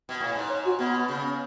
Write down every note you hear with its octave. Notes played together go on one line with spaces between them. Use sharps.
B2
A2
G#2
C#5
F#4
B2 B3
C#3